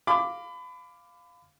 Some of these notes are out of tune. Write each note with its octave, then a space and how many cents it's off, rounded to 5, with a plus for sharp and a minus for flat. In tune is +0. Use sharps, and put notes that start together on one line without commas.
F5 +0 B5 +30 D6 +0